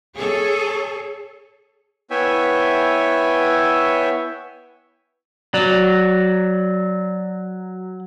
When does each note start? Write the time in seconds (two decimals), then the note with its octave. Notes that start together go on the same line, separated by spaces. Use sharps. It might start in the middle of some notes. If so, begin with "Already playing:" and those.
0.16 G#4 A4 C#5
2.11 B3 E4 C#5 E5 G5 G#5
5.54 F#3 D5